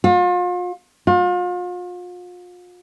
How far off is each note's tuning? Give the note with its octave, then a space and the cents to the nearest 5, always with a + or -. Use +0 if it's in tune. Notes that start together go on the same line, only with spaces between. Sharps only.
F4 +40
F4 +40